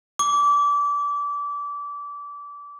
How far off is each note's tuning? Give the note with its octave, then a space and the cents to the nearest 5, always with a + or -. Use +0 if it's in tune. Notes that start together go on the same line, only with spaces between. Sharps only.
D6 -25